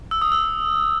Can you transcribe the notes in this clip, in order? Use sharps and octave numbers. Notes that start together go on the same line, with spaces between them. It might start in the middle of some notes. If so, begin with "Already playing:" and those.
E6
D#6
E6